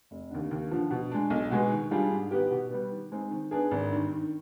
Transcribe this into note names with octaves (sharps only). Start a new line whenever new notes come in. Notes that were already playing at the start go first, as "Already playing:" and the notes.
F1
D#2 D3
D#2
D3 F3
B2
G#3 D4
B1
B2 G#3 B3
D#3
G3 D4 F4 G#4
G#2
D#3 B3 D#4 G4
B2
G3 B3
D#3
G#3 C4 D#4
D#3
B3 D4 G#4
G#1
G2 D#3
D#3